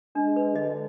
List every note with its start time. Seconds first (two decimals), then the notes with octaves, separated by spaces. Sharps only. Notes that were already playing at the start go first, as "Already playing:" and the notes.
0.15 G#3 D4
0.36 B4
0.56 D3 D#5